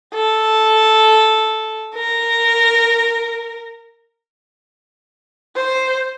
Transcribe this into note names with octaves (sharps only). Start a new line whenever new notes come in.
A4
A#4
C5